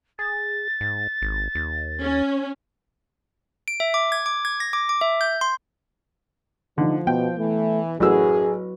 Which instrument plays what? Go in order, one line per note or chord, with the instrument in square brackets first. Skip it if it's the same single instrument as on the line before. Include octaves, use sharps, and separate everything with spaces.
[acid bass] G#4 [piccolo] A6
[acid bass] G#2
G#1
D#2
[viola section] C#4
[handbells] D7
E5
D6
G#6
D6
G#6
A#6
D6
D6
E5
G6
C6
[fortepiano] D3 [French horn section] F3 [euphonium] D#4
[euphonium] B2 [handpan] B3 [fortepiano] G5
[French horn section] E3 [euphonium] A3
[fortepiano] A1 E6 [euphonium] F#2 [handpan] F#3 F#4 B4 [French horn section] G#4